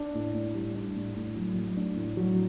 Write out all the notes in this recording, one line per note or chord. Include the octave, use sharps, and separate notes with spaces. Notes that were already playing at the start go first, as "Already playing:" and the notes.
Already playing: D4
A2
A2
G3
D4
A2
A2
F#3
A3
D4
A2
F#3